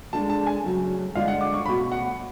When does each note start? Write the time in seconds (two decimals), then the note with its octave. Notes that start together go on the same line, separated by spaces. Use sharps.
0.13 G#3 D4 F4 A4 A5
0.30 A5
0.46 G#5
0.64 C#3 F#3 A3 C#4
1.15 D3 G#3 D4 F4 F5
1.28 F#5
1.41 D6
1.54 C#6
1.66 B2 A3 C#4 F#4 B5
1.92 F#5